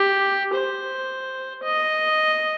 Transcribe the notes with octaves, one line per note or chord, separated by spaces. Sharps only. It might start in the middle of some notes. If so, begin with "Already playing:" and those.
Already playing: G4
C5
D#5